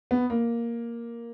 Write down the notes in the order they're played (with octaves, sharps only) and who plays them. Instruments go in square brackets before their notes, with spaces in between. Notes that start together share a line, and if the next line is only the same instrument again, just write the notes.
[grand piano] B3
A#3